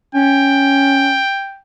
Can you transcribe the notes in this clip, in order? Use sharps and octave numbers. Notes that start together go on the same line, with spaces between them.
C#4 G5